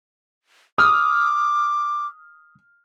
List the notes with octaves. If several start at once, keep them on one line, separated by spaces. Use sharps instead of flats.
D6 D#6 F6